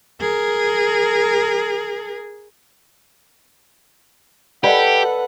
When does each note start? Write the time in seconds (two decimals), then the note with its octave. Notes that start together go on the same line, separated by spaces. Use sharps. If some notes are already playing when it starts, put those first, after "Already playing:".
0.21 G#4 A#4
4.64 G4 A4 B4 D5 D#5 F#5 B5